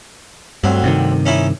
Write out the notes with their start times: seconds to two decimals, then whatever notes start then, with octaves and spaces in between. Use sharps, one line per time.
0.64 D2 G2 F#3 C4
0.84 G2 C3 D#3
1.26 C#4 D#4 E4